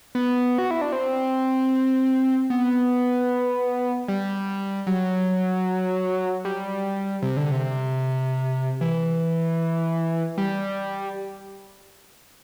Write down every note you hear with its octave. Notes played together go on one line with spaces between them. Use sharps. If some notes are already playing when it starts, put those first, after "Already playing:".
B3
F#4
E4
D4
C4
B3
G3
F#3
G3
C3
D3
C3
E3
G3